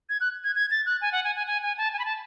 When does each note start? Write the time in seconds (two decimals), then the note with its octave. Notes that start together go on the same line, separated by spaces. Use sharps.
0.09 G#6
0.21 F#6
0.44 G#6
0.55 G#6
0.71 A6
0.86 F#6
1.01 G#5
1.12 F#5
1.24 G#5
1.36 G#5
1.47 G#5
1.62 G#5
1.78 A5
1.93 G#5
1.99 B5
2.05 A5